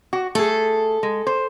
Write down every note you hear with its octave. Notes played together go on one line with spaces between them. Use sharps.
F#4
A3 G#4 A4
G#3
C5